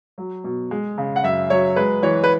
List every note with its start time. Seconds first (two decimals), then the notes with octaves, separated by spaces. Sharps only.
0.18 F#3
0.44 B2
0.71 G#3
0.98 C#3
1.16 F#5
1.23 F#2 E5
1.50 F#3 C#5
1.76 G#3 B4
2.02 E3 C#5
2.24 B4